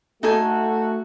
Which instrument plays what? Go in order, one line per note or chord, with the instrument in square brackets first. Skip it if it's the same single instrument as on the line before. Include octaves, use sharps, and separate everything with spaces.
[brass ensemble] A3 F#4 [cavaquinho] D#4 A4 G#5